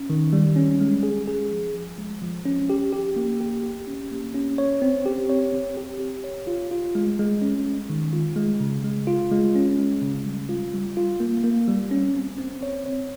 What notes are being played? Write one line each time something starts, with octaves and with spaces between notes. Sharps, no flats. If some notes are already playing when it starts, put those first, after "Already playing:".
Already playing: C#4
D#3
G3
C#4
G#3
G#4
G#4
F3
F3
G#3
F3
C#4
G4
G4
A#3
G4
G4
C#4
A#3
C#4
C#5
C4
G4
C#5
C4
G4
G4
C#5
F4
F4
G#3
G#3
C#4
G#3
D#3
F4
G#3
C#3
G#3
F4
G#3
C#4
G#3
C#3
G3
F4
G3
F4
A#3
A#3
G3
C#4
C4
C4
C#5
C#5